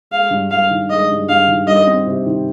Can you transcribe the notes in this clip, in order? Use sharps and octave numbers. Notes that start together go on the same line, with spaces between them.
G#3 F5
G2
G2 F5
D#3
G#3 D#5
G2
G2 F5
D#3
G3 D#5
C4
C3
D#3